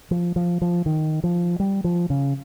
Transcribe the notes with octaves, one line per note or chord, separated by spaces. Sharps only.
F3
F3
F3
D#3
F3
G3
F3
C#3